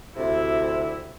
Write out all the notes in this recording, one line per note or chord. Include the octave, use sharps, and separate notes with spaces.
D2 C3 E4